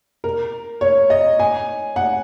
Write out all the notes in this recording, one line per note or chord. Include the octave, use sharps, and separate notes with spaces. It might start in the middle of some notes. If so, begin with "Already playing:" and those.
A#4
C#5
D#5
G#5
F#5